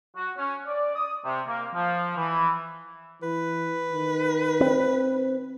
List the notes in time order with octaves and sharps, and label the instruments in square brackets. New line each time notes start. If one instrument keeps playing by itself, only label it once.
[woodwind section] F#4
C#4
D5
D#6
C3
A#3
F3
E3
[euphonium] E3 [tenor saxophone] B4
[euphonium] D#3
[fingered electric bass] C4